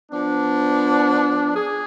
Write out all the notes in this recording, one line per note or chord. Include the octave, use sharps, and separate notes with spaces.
F3 B3 D4
G#4